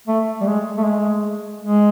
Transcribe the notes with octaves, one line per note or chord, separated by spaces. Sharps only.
A3
G3
G#3
A3
G#3
G#3